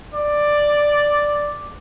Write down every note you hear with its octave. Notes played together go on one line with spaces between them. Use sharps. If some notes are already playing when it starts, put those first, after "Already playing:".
D5